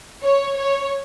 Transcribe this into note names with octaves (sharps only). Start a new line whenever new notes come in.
C#5
C#5